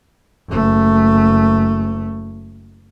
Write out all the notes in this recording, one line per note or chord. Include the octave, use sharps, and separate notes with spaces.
F#1 A3